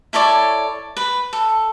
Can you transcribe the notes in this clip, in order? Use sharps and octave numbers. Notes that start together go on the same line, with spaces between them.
E4 A4 C#5 D5
B4
A4